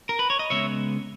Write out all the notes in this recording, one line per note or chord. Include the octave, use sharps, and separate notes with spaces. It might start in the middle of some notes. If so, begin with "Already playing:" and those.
A#4
B4
C#5
D#5
C#3 G#3 B3 C#5 E5